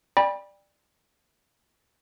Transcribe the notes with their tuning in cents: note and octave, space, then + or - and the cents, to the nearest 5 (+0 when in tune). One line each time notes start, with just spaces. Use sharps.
D5 +10 G5 +30 B5 -25